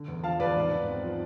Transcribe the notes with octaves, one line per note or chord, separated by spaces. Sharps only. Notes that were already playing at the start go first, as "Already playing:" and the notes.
Already playing: D3
E2
F3 F5 A5
E2 B4 D5
G#2
G#2
C4
F3